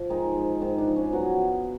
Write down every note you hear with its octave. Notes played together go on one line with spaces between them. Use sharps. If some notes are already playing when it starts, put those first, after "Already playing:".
Already playing: F3
D#3 G#3 D#4
G#2
G#2 D#3 D#4
D4
F3
C#4
F#3 B3 F#4